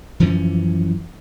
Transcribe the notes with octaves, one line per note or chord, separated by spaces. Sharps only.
F#2 E3 F3 C#4